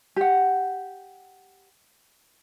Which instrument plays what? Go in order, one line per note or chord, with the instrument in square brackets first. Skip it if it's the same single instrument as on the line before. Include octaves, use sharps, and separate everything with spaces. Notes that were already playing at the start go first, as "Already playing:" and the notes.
[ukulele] G4 F#5